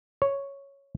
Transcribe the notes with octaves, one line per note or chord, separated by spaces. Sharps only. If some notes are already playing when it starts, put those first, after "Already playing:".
C#5